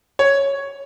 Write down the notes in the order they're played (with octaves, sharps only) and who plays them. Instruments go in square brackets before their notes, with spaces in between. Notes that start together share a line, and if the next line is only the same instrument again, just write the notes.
[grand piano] C#5